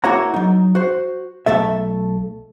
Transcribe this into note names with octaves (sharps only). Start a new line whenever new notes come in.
A#3 E4 F#4 C#5 F#5 A#5
F#3 D#4
F#4 C5
B1 A#2 A3 A4 E5